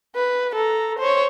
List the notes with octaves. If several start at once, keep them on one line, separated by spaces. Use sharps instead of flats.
B4
A4 A#5
C5 C#5